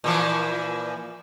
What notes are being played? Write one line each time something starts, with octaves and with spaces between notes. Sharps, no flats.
A#2 E3 F3